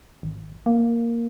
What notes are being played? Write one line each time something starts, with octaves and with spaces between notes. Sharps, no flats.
G#1
A#3